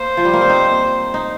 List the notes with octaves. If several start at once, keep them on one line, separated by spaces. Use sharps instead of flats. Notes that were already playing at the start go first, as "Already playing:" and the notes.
Already playing: A#3 C5
F3
G3
A#3
C4
D#4
D#4